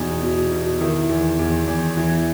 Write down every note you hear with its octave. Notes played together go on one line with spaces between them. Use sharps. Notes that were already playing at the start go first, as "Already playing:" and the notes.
Already playing: E2 B2 D#4
B2
B2
D#3 E4
E2
E2
E2
E3